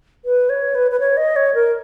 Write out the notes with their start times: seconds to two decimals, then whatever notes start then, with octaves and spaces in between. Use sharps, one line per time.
0.25 B4
0.49 C#5
0.75 B4
0.91 B4
1.00 C#5
1.17 D#5
1.36 C#5
1.54 A#4